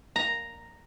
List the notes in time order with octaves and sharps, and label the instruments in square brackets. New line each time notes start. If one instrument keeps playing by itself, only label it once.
[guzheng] A#5